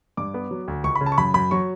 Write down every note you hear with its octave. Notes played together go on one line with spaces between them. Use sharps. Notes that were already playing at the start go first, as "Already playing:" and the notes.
G2 D6
B3
F#3
D2
C#2 C#6
B5
C#3
A5
C#6
F#2 B5
F#2 B5
F#3 C#6